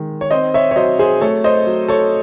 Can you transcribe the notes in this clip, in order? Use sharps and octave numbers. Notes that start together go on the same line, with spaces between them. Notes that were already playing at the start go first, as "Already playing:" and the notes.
Already playing: D#3 G#3
C#5
C4 C5 D#5
C#5 E5
C#5
F#3 C5 D#5
G#4 C5
A3 A4 C#5
C5 D#5
F#3
A4 C#5